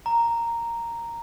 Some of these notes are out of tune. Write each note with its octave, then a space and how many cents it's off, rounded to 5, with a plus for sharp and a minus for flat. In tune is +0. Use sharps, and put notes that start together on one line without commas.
A#5 -5